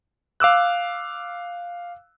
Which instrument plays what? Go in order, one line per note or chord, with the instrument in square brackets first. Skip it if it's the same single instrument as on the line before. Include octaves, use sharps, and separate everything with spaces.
[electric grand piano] F5 D6 E6 F#6